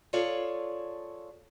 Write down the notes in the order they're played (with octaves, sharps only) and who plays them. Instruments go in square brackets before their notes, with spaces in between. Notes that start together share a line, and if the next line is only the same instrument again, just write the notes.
[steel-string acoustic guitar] F4 G#4 A4 C#5 D5 F5